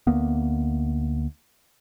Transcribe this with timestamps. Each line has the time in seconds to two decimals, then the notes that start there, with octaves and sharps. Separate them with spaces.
0.07 D2 A#3 B3